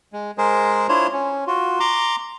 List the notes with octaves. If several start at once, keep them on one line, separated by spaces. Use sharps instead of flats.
G#3
G#3 G#4 A#4 C5
D4 E4 F4 C5 C#5
C#4
F4 F#4
A#5 C6 D6